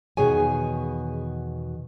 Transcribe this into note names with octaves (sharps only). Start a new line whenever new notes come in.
E2 B2 D#3 G#4 C#5 G#5